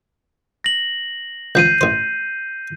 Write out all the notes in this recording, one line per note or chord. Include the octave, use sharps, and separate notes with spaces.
A#6 F#7
C#2 F3 G6 C7 D#7
A1 C5